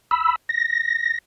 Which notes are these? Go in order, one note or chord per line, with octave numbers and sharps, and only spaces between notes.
B5 E6
A#6